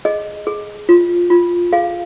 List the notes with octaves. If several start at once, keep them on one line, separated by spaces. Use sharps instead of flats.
G#4 D#5
G#4
F4
F4
G#4 F5